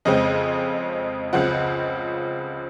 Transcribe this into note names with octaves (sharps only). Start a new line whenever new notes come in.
F2 C#3 G#3 C4 D#5
C#2 C#3 F3 C4 F#5